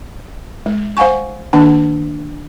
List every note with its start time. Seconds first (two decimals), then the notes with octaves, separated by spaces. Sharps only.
0.66 G#3
0.97 C5 F5 F#5 G#5 C#6
1.53 D#3 A#3 D4 A5